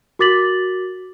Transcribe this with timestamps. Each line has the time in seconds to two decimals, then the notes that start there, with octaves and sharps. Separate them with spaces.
0.19 F#4 A#4 D6 A6 B6 F#7